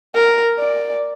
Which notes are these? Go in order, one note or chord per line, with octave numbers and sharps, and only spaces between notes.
A#4
D5